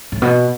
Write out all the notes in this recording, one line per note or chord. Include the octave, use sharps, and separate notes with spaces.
A2
B2